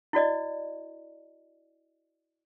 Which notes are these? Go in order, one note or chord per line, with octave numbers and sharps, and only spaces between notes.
E4 F#4 D5 D#5